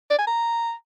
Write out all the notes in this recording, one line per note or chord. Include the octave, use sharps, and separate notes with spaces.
D5
G#5
A#5